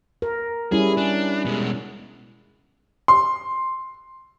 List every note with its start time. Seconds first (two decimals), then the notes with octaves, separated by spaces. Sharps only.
0.22 A#4
0.72 G3 C#4 E4 G#4
0.97 D4
1.45 B2 G#3
3.08 C6